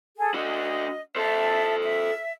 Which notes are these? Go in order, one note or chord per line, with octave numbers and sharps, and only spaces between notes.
G#4 A4
D4 F#4 D#5
A4 C5 E5 A5
E5